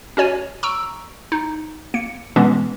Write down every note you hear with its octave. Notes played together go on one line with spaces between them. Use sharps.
C#4 F#4 C#5 G#5
A#5 C#6 E6 D7
D#4
A#3 C#7
B2 E3 G#3 B3 C#4